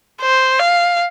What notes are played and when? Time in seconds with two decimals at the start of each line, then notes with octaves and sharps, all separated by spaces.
0.21 C5
0.59 F5